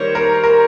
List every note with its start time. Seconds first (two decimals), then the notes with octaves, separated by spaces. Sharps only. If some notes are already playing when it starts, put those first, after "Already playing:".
Already playing: D#3 G3 A#3 C5 C#5
0.15 A#4
0.44 A#4